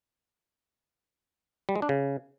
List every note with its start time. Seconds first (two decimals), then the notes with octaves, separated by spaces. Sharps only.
1.69 G3
1.75 G#3
1.82 D4
1.89 C#3